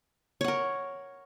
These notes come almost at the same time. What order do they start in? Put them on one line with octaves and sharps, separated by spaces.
C#5 F#5 A#4